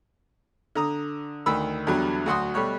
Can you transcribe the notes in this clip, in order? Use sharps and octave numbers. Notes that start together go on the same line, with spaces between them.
D3 A#5 D#6
D2 D#3 B5 E6
E2 D3 F#3 G3
D2 F#3 F#4 F#5 C6 D#6
B2 G3 A3 C#5 F#6